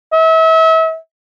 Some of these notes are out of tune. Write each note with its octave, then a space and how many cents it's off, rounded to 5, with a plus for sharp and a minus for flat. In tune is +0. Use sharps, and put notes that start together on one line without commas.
E5 -35